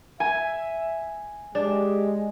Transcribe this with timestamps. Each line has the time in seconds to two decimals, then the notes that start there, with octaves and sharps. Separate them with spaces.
0.20 E5 G#5
1.55 G#3 D4 G4